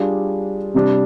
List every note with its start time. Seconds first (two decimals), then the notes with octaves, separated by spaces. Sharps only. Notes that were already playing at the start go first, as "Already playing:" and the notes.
Already playing: G3 D4 F4 G#4
0.74 C3 G3 D4